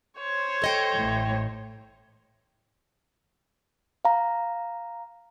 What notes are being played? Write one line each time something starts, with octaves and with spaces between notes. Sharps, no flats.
C5 C#5
A4 D#5 G5
A1 A2
F5 A#5